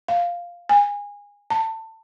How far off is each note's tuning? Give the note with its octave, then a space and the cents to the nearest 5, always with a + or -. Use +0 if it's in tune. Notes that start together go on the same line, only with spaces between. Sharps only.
F5 +0
G#5 -25
A5 +25